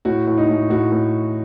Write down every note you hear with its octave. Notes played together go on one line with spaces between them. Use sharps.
A2 F#4
A2
D#4
A2
A2 F#4
A2